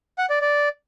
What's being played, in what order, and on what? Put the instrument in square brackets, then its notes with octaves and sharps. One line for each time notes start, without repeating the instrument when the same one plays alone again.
[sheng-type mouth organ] F#5
D5
D5